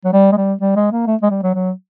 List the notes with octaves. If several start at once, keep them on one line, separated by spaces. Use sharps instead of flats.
F#3
G3
G#3
G3
G3
G#3
A#3
A3
G#3
G3
F#3
F#3